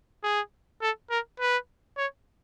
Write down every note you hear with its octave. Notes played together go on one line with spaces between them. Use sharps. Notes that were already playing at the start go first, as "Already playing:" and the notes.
G#4
A4
A#4
B4
C#5